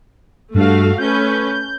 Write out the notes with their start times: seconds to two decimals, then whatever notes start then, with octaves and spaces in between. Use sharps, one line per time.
0.54 G2 A3 F#4 F5
0.98 A3 C#4 B4 G6